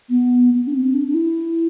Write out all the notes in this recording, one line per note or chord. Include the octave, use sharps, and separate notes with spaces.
B3
B3
D4
C4
D4
D4
E4